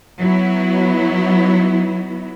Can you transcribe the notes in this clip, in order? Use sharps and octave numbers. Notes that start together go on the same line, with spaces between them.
F#3 B3 E4